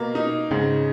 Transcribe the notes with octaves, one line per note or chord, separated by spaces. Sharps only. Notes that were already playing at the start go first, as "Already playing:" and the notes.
Already playing: B2 A#3
D#4
G#2 C#3